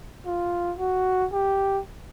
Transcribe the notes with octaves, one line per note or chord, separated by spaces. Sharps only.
F4
F#4
G4